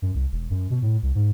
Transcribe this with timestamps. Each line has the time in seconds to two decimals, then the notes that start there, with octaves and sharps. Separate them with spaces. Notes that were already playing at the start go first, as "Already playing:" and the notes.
0.02 F#2
0.15 C2
0.32 E1
0.50 F#2
0.70 B2
0.82 A2
1.03 C2
1.15 G#2